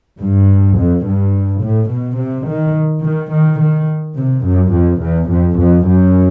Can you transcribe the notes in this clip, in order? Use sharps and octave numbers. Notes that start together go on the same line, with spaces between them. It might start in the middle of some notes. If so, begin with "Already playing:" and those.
G2
F2
G2
A2
B2
C3
D#3
D#3
D#3
D#3
C3
F#2
F2
E2
F2
F2
F#2